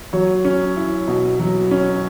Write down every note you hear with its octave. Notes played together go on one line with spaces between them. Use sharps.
F#3 C#5
C#4
E4
B2
F#3
C#4